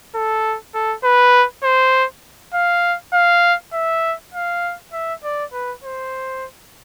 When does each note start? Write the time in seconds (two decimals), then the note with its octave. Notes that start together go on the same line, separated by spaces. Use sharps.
0.15 A4
0.75 A4
1.04 B4
1.64 C5
2.55 F5
3.13 F5
3.73 E5
4.34 F5
4.93 E5
5.24 D5
5.53 B4
5.84 C5